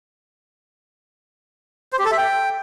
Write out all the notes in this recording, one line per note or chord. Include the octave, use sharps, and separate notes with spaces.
C5
G4
A4
E5
G5